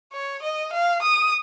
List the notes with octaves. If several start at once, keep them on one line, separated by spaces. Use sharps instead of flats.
C#5
D#5
F5
D#6